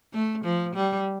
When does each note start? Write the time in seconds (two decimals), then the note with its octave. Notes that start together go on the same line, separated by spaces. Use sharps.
0.13 A3
0.44 F3
0.75 G3